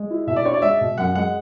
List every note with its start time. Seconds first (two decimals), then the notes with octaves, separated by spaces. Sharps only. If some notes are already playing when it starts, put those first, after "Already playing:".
Already playing: G#3
0.10 E4
0.27 B2 E5
0.36 D5
0.45 D4 C#5
0.54 D5
0.62 G#3 E5
0.81 B2
0.98 F#2 F#5
1.15 G#3 F#5